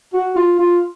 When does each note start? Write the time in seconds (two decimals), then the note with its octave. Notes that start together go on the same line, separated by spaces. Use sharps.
0.14 F#4
0.36 F4
0.59 F4